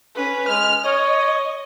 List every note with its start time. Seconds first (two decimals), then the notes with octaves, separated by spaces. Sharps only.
0.15 C#4 B4
0.48 G#3 F6
0.85 C#5 D#5